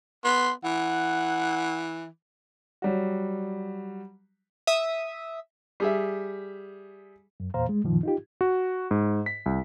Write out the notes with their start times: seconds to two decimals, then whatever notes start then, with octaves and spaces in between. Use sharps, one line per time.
0.24 B3 C6
0.64 E3 F#5
2.82 F#3 G3 F#4
4.67 E5 D#6
5.80 G3 G#4 E5
7.40 F#2
7.54 E2 A#2 C5 F5 A#5
7.69 G#3
7.84 F#2 A#2 D#3 F3
8.03 D#4 F4 G4
8.41 F#4
8.91 G#2
9.26 B6
9.46 C2